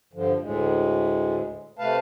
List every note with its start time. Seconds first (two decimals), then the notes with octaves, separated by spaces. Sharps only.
0.13 G2 D3 F3
0.41 D2 A2 G#3
1.79 C3 A3 B4 F5 A5